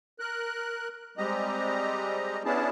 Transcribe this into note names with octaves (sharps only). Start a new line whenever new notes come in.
A#4 F#6
G3 G#3 C4 G4 D#5 A#5
B3 C#4 D4 E4 G#4 A5